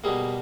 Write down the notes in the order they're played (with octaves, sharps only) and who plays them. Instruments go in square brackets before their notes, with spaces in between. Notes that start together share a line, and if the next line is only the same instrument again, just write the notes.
[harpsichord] B2 G3 A#3 G#4